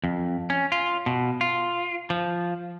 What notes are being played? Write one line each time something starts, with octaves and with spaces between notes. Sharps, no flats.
F2
C#4
F4
B2
F4
F3